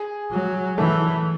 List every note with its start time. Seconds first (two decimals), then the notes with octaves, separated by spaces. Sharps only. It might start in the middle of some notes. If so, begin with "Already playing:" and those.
Already playing: G#4
0.32 F#3
0.78 E3 A3